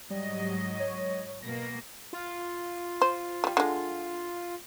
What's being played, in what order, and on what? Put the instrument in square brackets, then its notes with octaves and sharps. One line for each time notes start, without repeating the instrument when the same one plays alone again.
[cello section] G#2 F#3 D#5 [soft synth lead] G3
[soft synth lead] C#5
[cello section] B2 A#3 [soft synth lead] A#6
[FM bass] F4
[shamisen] C5
G3 A3
D3 G#3